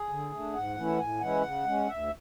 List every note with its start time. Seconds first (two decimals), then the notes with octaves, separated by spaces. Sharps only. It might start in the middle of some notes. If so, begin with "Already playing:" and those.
Already playing: G#4
0.09 D3
0.32 A3 D4
0.54 G#2 F#5
0.77 E3 A3 C#4 E4
0.98 A2 G#5
1.21 E3 G#3 C#4 E4 F#5
1.43 C#3
1.65 G#3 C#4
1.87 D2 E5